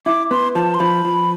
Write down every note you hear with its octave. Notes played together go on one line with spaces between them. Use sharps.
E4 D6
B3 C6
F3 A5
C6
F3 B5
F3